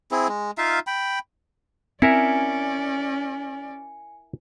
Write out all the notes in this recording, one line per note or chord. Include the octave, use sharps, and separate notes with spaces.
C4 E4 G#4
G#3
D#4 F4 E5 F5
G5 B5
C4 C#4 E4 A#4 D5 E5 G#5 C#7